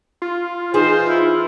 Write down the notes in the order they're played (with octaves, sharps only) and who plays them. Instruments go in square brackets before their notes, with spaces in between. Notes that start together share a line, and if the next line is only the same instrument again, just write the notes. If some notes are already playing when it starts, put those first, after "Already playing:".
[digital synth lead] F4
[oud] E3 G#4 [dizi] D#4 [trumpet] C5
[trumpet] E4